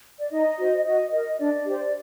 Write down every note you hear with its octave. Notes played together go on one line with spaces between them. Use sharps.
D5
D#4 D#5
F#4 C5
F#4 D#5
A#4 D#5
D4 D5
G4 C5